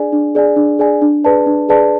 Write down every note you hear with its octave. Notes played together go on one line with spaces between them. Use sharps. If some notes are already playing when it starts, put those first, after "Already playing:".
Already playing: D4 G#4 D5 G#5
D4
G#4 D5 G#5
D4
G#4 D5 G#5
D4
G#4 B4 D5 A5
D4
G#4 B4 D5 A5